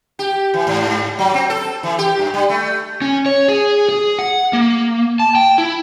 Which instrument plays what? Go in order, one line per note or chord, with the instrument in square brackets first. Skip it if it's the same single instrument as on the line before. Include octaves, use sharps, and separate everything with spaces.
[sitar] G4
E3
G#2
G#2
F#3
C4
A4
E3
G4
G2
G3
A3
[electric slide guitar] C#4
C#5
G#4
G#4
F#5
A#3
A5
G5
E4